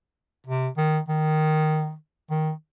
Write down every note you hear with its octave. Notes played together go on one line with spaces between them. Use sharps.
C3
D#3
D#3
D#3